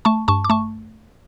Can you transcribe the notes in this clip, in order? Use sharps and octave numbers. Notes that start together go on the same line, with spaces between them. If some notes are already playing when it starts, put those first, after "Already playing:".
A3 A5 C#6
G2 A5 C#6
D6
A3 A5 C#6